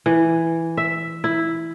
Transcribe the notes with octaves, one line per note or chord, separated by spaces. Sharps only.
E3
E5
E4